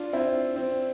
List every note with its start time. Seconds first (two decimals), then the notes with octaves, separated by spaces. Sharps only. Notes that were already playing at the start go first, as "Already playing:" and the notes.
Already playing: D4 F4
0.13 C4 E4
0.56 C4